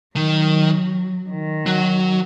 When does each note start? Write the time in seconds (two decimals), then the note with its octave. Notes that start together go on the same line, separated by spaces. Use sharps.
0.16 D#3 F#3
1.29 D#3
1.66 F#3